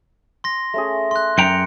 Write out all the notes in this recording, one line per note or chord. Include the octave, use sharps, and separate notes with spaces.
C6 A#6
A3 C#4 G#4
C6 F#6
F#2 G5 A#5 C#7